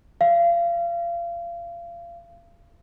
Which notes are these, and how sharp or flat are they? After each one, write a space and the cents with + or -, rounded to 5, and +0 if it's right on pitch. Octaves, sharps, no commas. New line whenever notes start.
F5 -30